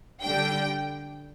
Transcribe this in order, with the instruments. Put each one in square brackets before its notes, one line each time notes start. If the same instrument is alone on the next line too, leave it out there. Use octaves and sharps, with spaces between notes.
[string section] D3 G3 D4 G5